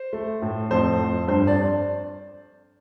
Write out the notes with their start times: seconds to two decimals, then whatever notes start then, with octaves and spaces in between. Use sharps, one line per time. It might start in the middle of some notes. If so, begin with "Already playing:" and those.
Already playing: C5
0.13 A3
0.42 A2
0.71 F2 C5
0.99 F2
1.28 G2 C5
1.47 D5